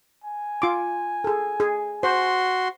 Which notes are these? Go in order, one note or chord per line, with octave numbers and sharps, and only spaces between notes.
G#5
F4 C6 D6
G#4 A4
G#4
F#4 C5 C6